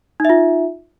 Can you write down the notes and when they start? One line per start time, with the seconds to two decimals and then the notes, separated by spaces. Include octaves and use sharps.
0.20 D#4
0.25 E5
0.30 F4